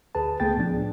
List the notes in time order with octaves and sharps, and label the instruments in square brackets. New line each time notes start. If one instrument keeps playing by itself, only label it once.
[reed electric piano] D2 G#4 B4 A5
C#2 A3 B3 G#4 G5 A6
A2 F3 D4